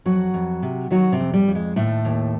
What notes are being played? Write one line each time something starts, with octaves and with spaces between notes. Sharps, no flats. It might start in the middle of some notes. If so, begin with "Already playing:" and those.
F2 F#3 F#4
F2
C3
D#3 F#3 F#4
C3 C4
F2
G3
F2
G#3
D#2 A2 A3
D#2